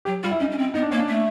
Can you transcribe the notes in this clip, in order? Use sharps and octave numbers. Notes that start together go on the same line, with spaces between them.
F#3 G4
G3 F4
E4
C#4 D#4
C#4
C4
B3 D#4
D4
A#3 C#4
D4
A3